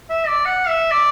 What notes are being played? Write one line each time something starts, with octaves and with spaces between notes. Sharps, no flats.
E5
D5
F#5
E5
D5